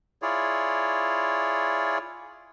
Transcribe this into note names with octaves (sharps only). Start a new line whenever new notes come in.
E4 F4 G#4 C#5 D5